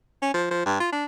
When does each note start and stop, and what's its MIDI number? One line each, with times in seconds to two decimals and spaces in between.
0.22 0.31 61
0.34 0.49 53
0.51 0.64 53
0.66 0.80 43
0.80 0.88 65
0.93 1.06 62